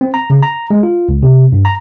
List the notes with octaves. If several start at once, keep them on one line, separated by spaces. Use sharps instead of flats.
C4
A#5
C#3
A#5
G#3
F4
C#2
C3
G2
A#5